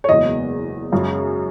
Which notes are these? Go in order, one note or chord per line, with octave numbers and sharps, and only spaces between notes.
C#5
F#1 E2 B2 G#3 D#5
F#2 C#3 G#3